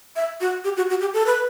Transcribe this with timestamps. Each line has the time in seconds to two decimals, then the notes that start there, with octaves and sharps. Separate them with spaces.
0.16 E5
0.41 F#4
0.64 G4
0.77 F#4
0.90 F#4
1.01 G4
1.14 A4
1.26 B4